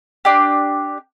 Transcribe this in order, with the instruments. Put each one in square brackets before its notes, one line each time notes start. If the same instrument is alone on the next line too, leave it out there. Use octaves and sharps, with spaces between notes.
[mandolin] D4 G4